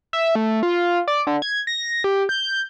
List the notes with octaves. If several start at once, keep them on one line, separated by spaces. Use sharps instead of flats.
E5
A3
F4
D5
D3
G#6
A#6
G4
G6